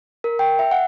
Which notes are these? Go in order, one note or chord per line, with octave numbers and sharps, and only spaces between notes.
A#4
G5
E5
F#5